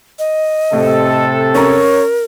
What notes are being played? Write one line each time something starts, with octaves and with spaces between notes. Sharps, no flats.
D#5
A2 C3 A4
C#4 A#4 C#5 A#5